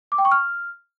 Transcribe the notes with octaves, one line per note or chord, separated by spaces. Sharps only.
D6
G5
C#6
F6